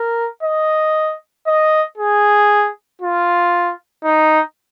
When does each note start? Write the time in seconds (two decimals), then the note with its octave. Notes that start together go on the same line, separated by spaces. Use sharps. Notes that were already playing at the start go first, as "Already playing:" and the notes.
Already playing: A#4
0.43 D#5
1.47 D#5
1.98 G#4
3.01 F4
4.04 D#4